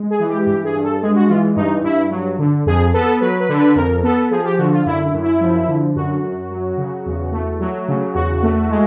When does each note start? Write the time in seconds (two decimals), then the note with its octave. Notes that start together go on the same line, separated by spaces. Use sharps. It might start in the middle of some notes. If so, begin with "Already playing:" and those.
Already playing: G#3
0.10 G#4
0.19 E3
0.28 G4
0.46 G2 G4
0.64 G#4
0.75 G2
0.83 A4
1.02 G#3 G#4
1.16 F#4
1.28 E3 F4
1.56 G2 D#4
1.83 G2 E4
2.11 F#3
2.38 D3
2.66 F2 G#4
2.94 B3 A4
3.20 F#3 B4
3.40 B4
3.49 D3
3.58 B4
3.75 F2 A#4
4.03 B3 A4
4.31 F3 G#4
4.45 G4
4.58 D3 F#4
4.72 F4
4.86 F#2 E4
5.04 E4
5.14 F#2
5.23 E4
5.41 F3
5.68 D3
5.95 F#2 F#4
6.23 F#2
6.51 F#3
6.77 C#3
7.06 E2
7.32 A3
7.60 F#3
7.88 C#3
8.14 E2 F#4
8.42 A3
8.70 G#3